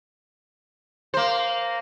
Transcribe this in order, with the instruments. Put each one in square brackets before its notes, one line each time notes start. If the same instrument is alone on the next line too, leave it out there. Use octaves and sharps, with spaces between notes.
[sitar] A#3 C5